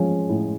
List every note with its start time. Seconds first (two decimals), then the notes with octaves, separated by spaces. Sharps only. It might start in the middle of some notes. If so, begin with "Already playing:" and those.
Already playing: F3 G#3 C#4
0.29 A2